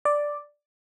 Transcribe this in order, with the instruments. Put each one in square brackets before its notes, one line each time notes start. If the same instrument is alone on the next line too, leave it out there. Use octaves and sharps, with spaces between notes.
[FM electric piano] D5